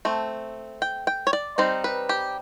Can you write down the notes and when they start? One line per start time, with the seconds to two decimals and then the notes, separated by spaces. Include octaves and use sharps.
0.05 A3 C4
0.82 G5
1.07 G5
1.27 C#5
1.33 D5
1.58 G3 C4 D#4 C5
1.84 B4
2.09 G4